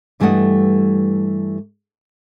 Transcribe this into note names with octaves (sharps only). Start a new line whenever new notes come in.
G2 E3 G3 A3 D#5 F#5